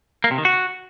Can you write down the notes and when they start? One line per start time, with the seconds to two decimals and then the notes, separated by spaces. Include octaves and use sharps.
0.24 A#3
0.31 C3
0.38 D#3
0.45 F#4